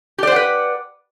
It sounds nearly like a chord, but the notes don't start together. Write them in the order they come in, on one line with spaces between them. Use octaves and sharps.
G4 D5 C5 F#5 B4